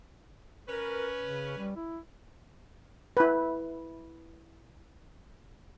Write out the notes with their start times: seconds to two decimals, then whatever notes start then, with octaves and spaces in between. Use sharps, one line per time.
0.68 C#4 A#4 B4
1.22 C#3
1.58 G3
1.77 E4
3.17 E4 B4